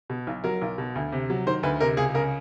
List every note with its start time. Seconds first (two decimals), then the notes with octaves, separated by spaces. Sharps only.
0.10 B2
0.27 B1
0.44 F#3 A#4
0.62 B1
0.78 B2
0.95 D2
1.12 C3
1.30 F#3
1.47 D#3 C5
1.63 D2 B4
1.80 C3 A#4
1.97 C#2 G#4
2.14 C#3 A#4